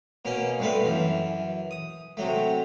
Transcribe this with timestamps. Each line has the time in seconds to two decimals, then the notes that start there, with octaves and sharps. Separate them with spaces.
0.25 B2 A#3 C#4
0.59 G2 C3 A3 B4 F5
0.83 F#2 E3
1.71 D#6
2.17 C3 F#3 A3